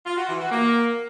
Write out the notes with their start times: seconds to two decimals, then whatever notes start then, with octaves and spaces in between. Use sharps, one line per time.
0.06 F4
0.17 F#4
0.29 E3
0.40 F#4
0.51 A#3